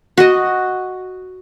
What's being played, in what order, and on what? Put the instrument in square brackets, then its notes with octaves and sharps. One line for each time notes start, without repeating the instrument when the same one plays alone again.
[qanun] F#4 D#5